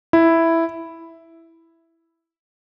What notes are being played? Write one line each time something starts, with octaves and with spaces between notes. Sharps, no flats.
E4